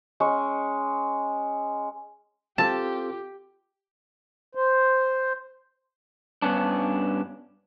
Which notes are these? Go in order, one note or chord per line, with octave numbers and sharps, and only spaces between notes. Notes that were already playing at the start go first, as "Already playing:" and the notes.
G#3 C#4 C#6
C4 F4 G4 A4 A5
C5
G2 B3 C#4 D4